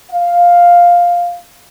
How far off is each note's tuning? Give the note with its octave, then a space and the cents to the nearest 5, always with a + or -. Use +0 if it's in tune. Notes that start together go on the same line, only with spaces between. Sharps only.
F5 +5